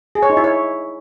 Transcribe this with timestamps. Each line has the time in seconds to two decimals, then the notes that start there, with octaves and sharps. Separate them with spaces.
0.15 G#4
0.23 C#5
0.30 D#4
0.37 E4
0.44 C#5